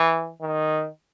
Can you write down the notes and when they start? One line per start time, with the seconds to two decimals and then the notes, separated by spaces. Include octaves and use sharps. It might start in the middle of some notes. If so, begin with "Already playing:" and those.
Already playing: E3
0.41 D#3